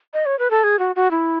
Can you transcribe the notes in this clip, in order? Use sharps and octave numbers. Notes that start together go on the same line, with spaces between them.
D#5
C#5
B4
A4
G#4
F#4
F#4
E4